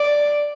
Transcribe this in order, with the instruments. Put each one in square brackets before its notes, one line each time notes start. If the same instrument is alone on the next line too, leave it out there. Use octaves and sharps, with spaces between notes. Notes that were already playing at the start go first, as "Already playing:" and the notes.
Already playing: [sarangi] D5